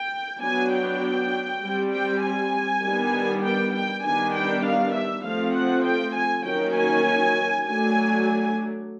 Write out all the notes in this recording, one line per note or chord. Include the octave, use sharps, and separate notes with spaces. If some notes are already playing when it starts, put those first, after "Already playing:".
Already playing: G5
F#3 B3 D4 G#5
G5
G3 C4
G5
G#5
D#3 G3 B3 D4
G5
G5
D#3 G3 B3 D4 G#5
G5
F5
E5
F3 A3 C4 F5
F#5
G5
G#5
D#3 F#3 A#3 C#4 G5
G#5
F#3 A3 D4 G#5